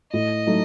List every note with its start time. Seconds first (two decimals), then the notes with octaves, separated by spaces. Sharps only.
0.13 A2 D#5
0.47 F#3 A3 D#4